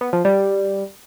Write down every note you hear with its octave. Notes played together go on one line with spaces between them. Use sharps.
B3
F3
G3